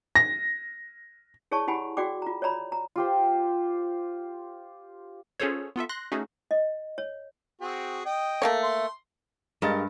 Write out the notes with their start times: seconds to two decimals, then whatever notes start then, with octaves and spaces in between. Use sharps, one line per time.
0.15 A#6
1.51 E4 G#4 C#5 D5 A5 C#6
1.68 E4 G4 F#5 G#5 B5
1.97 F#4 G#4 D5 G5 D6
2.22 F4 A#5
2.42 C#5 D5 A#5 B5
2.72 A#5
2.96 F4 G4 C5
5.40 C#4 F4 G#4 A4 C5 C#5
5.76 B3 F4 A4 E5
5.89 C6 F#6 A#6
6.12 A3 C#4 D#4 F#4 G#4
6.51 D#5
6.98 C#5
7.61 C4 F#4 G#4
8.05 D#5 G5
8.42 A3 A#3 C#5
8.63 C6
9.62 G2 G#3 G4 A#4 D#5 F5 A6